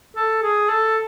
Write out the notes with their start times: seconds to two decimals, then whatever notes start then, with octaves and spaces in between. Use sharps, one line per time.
0.16 A4
0.43 G#4
0.69 A4